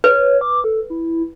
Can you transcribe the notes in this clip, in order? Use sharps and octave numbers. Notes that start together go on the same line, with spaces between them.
B4 C#5
D6
A4
E4